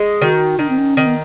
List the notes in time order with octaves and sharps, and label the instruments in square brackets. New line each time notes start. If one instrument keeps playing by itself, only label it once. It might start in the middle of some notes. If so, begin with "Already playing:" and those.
Already playing: [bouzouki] G#3
[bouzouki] D#3 [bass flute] F#4
[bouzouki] D#3 [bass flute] D4
[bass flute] C4
C#4
[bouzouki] D#3 [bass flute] C4
[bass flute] B3